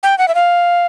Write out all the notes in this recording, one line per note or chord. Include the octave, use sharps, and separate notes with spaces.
G5
F#5
E5
F5